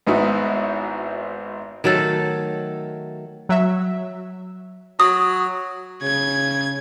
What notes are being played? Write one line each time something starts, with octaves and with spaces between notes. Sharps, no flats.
G#1 G#2 B3 D#4 E4 F#4
D#3 F#3 A3 A4
F#3 E5
F#3 D#6
C#3 G#6